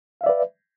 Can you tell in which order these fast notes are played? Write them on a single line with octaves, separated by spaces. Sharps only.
F5 E5 D5 B4